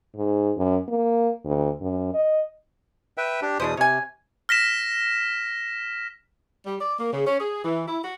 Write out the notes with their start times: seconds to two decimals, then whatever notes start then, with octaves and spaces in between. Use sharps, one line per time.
0.16 G#2
0.57 F#2
0.88 A#3
1.45 D2
1.81 F#2
2.14 D#5
3.18 B4 E5 G5
3.42 D4 G4
3.60 E2 B2 D4 E4 C5 D#6
3.77 C3 C#5 G#5
4.49 F6 A#6 B6 E7
6.66 G3
6.80 D5
6.99 A#3
7.12 C#3
7.27 C#4
7.40 G#4
7.64 E3
7.87 E4
8.04 F#4